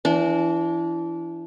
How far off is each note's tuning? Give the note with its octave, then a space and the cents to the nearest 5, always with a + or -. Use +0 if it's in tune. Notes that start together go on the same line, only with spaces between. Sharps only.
E3 +20 D4 -25